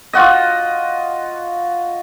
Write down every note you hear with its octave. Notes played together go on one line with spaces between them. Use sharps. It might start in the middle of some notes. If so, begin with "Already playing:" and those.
F4 F#4 D#5